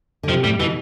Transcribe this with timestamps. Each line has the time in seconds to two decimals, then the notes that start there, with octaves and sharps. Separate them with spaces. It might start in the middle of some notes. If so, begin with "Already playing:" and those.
0.23 D3
0.28 C3 F3
0.44 A2 G3
0.59 B2 E3